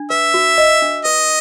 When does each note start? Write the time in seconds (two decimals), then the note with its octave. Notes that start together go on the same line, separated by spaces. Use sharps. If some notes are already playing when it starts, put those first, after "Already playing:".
Already playing: D4
0.10 B4 E5
0.34 F#4
0.58 D#5
0.82 D4
1.05 B4 D#5